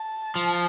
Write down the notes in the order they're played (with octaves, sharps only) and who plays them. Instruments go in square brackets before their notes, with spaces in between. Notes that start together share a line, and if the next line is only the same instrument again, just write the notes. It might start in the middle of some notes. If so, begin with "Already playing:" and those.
Already playing: [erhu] A5
[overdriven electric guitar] F3